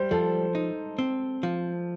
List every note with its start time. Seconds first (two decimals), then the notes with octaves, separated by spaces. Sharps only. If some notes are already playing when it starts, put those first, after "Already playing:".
Already playing: G3 C5
0.11 F3 A4
0.55 D#4
0.99 C4
1.43 F3